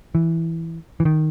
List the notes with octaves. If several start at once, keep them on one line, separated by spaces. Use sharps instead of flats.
E3
E3
D#3